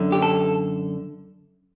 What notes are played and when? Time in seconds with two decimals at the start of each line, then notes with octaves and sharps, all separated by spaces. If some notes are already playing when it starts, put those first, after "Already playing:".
Already playing: F#2 D3
0.12 G4
0.22 A4